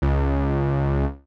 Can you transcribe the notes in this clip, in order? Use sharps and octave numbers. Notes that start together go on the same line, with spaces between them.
C#2